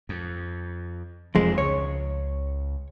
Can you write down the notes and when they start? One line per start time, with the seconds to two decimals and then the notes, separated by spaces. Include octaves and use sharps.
0.09 F2
1.35 F1 F2 D#3 G#3 C4
1.58 C#2 C#3 C#5